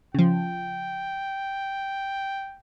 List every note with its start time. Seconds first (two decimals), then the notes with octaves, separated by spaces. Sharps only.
0.14 C#3 F3 G5